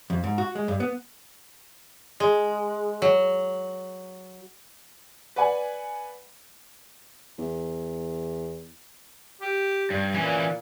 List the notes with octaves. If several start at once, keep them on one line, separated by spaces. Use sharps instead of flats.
F2
G#2
F#4
G#3
G2
B3
G#3
F#3
B4 D5 F#5 G#5
E2
G4
G2
A#2 E3 C#4